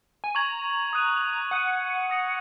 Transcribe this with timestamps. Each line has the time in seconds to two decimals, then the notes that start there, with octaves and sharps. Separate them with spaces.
0.24 G#5
0.35 A#5 C#6 G#6 F#7
0.93 D#6 F#6 D#7
1.51 F#5 D#6 F#6 D#7
2.10 D#6 A#6 C#7 F#7